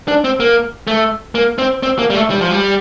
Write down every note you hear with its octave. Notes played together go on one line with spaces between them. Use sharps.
D4
C4
A#3
A3
A#3
C4
C4
A#3
G3
A3
G3
F3
G3